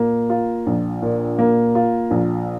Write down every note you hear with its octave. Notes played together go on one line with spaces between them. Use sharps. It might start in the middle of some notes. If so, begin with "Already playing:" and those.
Already playing: A#2 A#3
F4
A#1
A#2
A#3
F4
A#1